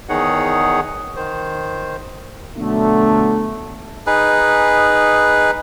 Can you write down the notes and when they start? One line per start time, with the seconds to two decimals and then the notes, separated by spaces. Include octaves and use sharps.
0.09 E2 D#3 D#4 G#4 C#5 F#5
1.16 D#3 C5
2.57 B2 D3 F#3 A3
4.07 D#4 G#4 B4